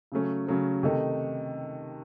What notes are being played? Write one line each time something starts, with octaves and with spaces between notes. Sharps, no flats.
C#3 F#3 A3 C#4
C#3 F#3 A3 C#4
C3 D#3 A3 D#4 A4